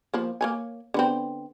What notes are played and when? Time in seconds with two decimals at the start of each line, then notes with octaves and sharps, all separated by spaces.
0.14 F3 A#3
0.41 A#3 C#5 G#5
0.94 D3 B3 C4